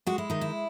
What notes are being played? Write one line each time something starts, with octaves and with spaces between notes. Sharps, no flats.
G#3 F#4
E4
D#3 D#4
E4